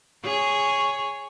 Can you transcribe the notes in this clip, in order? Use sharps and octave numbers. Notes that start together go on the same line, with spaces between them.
G#4 C#5